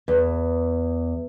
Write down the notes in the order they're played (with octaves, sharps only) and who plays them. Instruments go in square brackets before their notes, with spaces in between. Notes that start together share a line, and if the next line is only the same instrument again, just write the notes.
[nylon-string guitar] E2